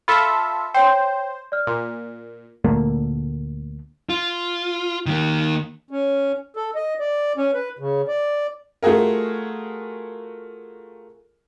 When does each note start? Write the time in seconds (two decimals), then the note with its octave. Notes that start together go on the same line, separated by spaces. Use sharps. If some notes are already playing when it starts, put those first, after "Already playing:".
0.08 F4 A4 E5 B5 E6
0.74 C5 C#5 G5
1.52 D5 F6
1.67 A#2
2.65 D2 A#2 A3 A#3
4.09 F4
5.06 D#3 A#3
5.91 C#4
6.56 A4
6.75 D#5
7.00 D5
7.37 C#4
7.54 B4
7.79 C#3
8.08 D5
8.83 A3 F4 F#4 G#4 A#4